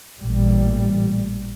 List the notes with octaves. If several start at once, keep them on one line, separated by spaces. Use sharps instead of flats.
A1 A#2 G3